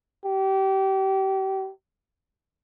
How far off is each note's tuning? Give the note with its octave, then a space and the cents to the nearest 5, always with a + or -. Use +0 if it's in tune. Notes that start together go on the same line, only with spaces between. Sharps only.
G4 -30